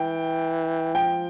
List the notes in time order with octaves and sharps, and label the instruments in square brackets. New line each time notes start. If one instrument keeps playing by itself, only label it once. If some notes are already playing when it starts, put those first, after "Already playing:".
Already playing: [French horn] E3 [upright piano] G5
[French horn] F3 [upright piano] G5